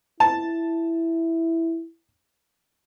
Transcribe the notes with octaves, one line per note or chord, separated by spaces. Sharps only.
E4 A5